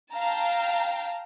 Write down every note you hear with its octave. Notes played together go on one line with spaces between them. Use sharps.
F5 G5 A5 A#5